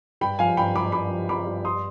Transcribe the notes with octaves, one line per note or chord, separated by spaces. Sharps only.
G2 G5 B5
F3 F5 G#5
G2 G5 B5
G2 B5 D6
G2 B5 D6
F3
F3 B5 D6
G2
G3 C6 D#6